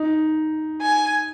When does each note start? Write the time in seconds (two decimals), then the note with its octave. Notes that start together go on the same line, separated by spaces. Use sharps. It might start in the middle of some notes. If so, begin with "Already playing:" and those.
Already playing: D#4
0.81 G#5